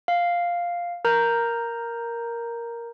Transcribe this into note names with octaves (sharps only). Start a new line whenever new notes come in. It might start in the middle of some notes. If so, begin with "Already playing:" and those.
F5
A#4 A#5 G6